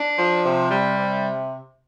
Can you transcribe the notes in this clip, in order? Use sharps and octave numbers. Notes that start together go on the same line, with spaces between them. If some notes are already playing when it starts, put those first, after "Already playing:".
Already playing: D4
F3
C3
G3
C3